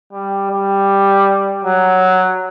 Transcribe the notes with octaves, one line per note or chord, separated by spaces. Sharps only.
G3
G3
F#3